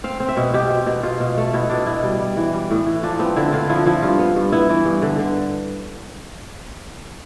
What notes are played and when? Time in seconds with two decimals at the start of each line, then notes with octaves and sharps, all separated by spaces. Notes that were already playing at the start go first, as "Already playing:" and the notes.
0.04 C4 F5
0.20 C4
0.29 E5
0.37 B2
0.54 B2 G4
0.71 C4
0.86 B2
1.03 B2 F4
1.20 B2
1.38 A3
1.54 B2 E4
1.70 B2 D4
1.86 B2 E4
2.03 G3
2.20 G3
2.37 E3
2.54 G3
2.71 A2
2.86 E3
3.03 F3 D4
3.19 B3 C4
3.36 D3 E4
3.53 D3 F4
3.69 F3 E4
3.86 F3 E4
4.02 G2 F4
4.19 B3
4.36 G2
4.52 B3 E4
4.70 E3
4.86 G2
5.02 D3
5.19 D3